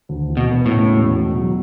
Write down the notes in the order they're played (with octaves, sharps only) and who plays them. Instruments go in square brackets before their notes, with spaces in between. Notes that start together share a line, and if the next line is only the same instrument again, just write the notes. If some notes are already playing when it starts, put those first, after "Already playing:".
[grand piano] D2
E3
[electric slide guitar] B2
[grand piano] B3
[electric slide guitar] A2
[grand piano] C#3
E1
B2
F#3